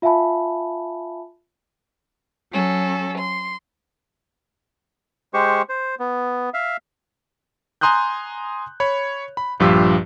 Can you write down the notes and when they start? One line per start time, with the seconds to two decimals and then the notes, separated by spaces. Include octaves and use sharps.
0.02 F4 E5 F5 G#5 A5 B5
2.51 F#3 C#4 A4
3.18 C6
5.34 G#3 G4 C5 C#6
5.69 C5
5.99 B3
6.54 E5 F5
7.81 G#5 A#5 C6 D#6 F#6 G6
8.80 C#5 B5
9.37 B5
9.60 A#1 G2 F3 F4 G4 E6